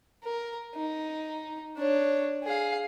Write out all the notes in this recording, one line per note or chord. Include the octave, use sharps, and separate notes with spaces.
A#4
D#4
D4 C#5
G#4 F5